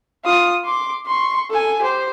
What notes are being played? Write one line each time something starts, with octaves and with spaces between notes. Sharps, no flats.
F4 D#6
C6 D6
C6 C#6
A4 G#5
G4 C5